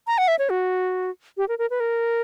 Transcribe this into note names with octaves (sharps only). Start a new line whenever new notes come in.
A#5
F#5
E5
C#5
F#4
G4
A#4
A#4
B4
A#4